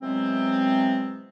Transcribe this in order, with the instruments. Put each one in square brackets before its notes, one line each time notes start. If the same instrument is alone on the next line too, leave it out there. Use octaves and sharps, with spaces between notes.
[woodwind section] C3 E3 F#3 G#3 B3 C4